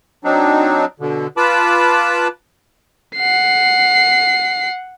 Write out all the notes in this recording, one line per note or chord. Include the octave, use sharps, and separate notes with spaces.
F#3 C4 D4 D#4
B2 D3
F4 B4 A5 B5 D6
F#5 C7